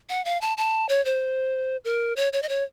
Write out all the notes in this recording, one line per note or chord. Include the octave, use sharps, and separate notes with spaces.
F#5
F5
A5
A5
C#5
C5
A#4
C#5
C#5
D#5
C#5